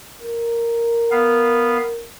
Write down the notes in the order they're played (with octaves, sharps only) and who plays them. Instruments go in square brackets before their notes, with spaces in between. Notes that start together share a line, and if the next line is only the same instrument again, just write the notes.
[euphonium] A#4
[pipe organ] B3 F5